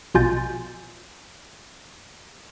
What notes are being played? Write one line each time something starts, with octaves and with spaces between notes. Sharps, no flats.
A#1 B2 F4 G#5 G6 A6